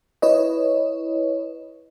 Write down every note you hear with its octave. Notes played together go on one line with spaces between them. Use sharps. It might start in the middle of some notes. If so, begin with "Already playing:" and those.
E4 B4 C#5 D#5